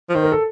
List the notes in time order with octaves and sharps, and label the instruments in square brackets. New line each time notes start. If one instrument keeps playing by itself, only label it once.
[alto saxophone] F3
[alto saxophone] D#3 [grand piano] C5
[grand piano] A#4
A4